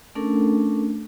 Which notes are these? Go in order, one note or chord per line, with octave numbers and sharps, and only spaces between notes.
A3 C#4 D4 A4 A#4